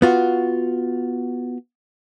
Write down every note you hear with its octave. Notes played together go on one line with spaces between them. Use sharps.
B3 F4 F#4